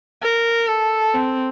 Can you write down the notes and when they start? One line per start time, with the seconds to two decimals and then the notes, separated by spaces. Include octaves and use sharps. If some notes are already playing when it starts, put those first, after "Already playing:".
0.22 A#4
0.68 A4
1.14 C4